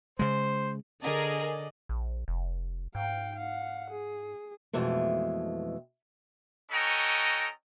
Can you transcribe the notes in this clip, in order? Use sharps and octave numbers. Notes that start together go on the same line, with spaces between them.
C#3 G#3 C5
D3 G#4 A#4 D5 D#5
A#1
F1
G#2 F5 G5
F5 F#5
G#4
F2 B2 E3 G#3 A3
C#4 F#4 A4 D#5 G5 A#5